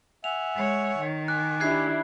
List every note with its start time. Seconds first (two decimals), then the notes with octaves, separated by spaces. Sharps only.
0.24 E5 F#5 G#5 F7
0.56 G#3 C#5
0.98 D#3
1.28 G#5 C#6 D6 F#6
1.60 D4 E4 G4 F#6 G#6 C7